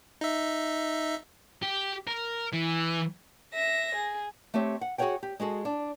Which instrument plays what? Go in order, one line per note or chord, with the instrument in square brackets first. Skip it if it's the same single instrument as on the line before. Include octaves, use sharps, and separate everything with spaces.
[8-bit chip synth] D#4 E5
[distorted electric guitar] G4
A#4
E3
[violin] E5 A#6
G#4
[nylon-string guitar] A3 C4 G4 C#5
F#5
F#4 G#4 C5 C#5 F#5 G5
G4
G#3 F#4 G#4 A4
D4